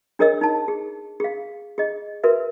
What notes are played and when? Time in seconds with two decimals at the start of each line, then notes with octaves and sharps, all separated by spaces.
0.19 D4 G#4 A#4 C#5 D#5 E6
0.41 D#4 A5
0.68 G#4
1.20 G#4 F5
1.78 G#4 D#5
2.23 F#4 A#4 B4 E5